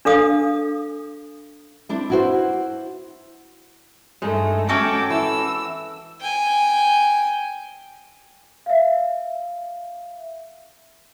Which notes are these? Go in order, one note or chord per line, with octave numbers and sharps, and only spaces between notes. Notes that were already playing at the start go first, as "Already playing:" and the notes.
D4 A4 F5 D#6
C4 D4 E4
E4 F#4 C5
G2 G#3 A3 D#4
C#4 F#4 A4 G5 D6
E3 E6
G5 G#5
E5 F5